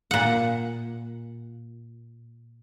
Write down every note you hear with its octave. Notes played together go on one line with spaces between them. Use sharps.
A#2 F#5